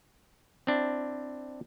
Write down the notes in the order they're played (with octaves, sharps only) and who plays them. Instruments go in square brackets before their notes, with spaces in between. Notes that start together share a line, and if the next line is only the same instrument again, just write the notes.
[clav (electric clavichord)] C4 D4 E4